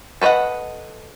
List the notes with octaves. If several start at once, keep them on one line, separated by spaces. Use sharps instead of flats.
A4 B4 C5 D#5 F#5